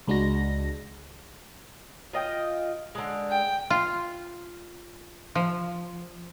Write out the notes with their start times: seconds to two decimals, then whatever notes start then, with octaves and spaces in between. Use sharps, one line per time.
0.07 C#2 G#3 D4 F#4 A#6
2.13 F4 D#5 G5
2.95 D3 G#3
3.29 G5
3.70 F4
5.35 F3